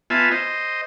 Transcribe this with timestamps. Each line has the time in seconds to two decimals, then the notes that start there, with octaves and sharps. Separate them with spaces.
0.10 B3 F4 E5 G#5 A5
0.32 C5 D#5